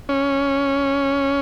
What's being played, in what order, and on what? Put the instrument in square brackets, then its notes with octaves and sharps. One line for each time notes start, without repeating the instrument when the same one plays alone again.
[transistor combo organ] C#4